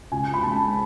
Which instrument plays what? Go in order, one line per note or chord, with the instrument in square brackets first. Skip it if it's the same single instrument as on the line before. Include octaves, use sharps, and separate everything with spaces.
[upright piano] C#2 G#5
B5
C#3 G#3 A5